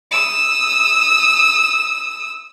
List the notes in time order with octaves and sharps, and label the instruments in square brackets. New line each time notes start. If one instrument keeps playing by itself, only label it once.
[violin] D#6 E6